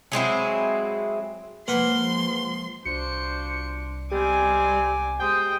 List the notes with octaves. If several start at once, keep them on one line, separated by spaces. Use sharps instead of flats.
F#3 G#3 C4 E4
F3 G#3 A#3 B4 F#5 C6
C2 D4 F4 F#4 C5 C#7
D3 G3 G#3 C4 G#5 D6
G#3 G4 C5 G5 D#6